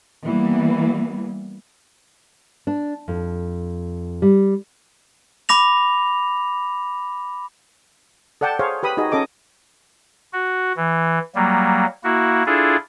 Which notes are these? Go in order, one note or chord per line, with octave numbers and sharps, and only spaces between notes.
E3 G3 A#3 B3
D4
F2
G3
B5 D6 A#6 F7
A4 D5 F#5 G5 A5
G#4 C5 C#5 F5
G4 B4 B5 D#6
D#4 F#4 G#4 D#5
C#4 A4 D#5 D6
F#4
E3
F#3 G3 A#3
A#3 E4 F#4
D4 E4 F4 G#4 A4